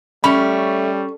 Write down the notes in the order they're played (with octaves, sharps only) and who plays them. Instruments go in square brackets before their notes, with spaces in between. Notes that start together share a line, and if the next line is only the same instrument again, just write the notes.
[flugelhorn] G3 [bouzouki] A3 [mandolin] C#4 [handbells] B5